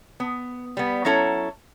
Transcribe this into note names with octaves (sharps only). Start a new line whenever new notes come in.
B3
G3 B3
F#3 C#4 E4 A4 A#5